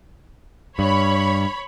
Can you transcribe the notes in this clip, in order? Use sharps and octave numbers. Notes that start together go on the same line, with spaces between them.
G2 C#5 B5